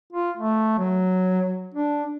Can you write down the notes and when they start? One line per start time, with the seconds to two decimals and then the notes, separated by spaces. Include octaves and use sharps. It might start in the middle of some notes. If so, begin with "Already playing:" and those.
0.12 F4
0.37 A3
0.78 F#3
1.75 D4